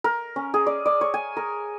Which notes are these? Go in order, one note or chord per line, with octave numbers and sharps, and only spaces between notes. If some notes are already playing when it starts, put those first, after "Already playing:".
A#4
C#4
G#4
D5
D5
C#5
G#5
A#4